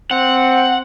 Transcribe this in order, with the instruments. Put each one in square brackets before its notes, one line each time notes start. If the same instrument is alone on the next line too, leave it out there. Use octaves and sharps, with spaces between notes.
[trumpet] C4 [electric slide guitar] F#5